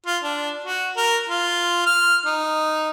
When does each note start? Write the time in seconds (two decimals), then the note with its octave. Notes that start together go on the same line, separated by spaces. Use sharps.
0.06 F4
0.24 D4
0.64 F#4
0.96 A#4
1.29 F4
1.86 F6
2.26 D#4